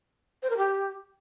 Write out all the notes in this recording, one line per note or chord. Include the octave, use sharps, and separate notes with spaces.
C5
A#4
G4